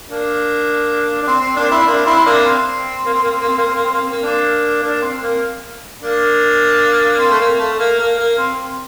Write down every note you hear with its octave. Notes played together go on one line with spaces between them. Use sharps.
A#3 D4
D4
C4
C4
A#3 D4
C4 E4
A#3 D4
C4 E4
A#3 D4
C4
A#3
C4
A#3
C4
A#3
C4
A#3
C4
A#3
C4
A#3
C4
A#3
A#3 D4
A#3 D4
C4
A#3
A#3 D4
C4
A3
A#3
A3
A#3
A#3
A#3
C4